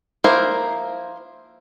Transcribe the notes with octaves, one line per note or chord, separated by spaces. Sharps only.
F3 A#3 E4 A#4 C5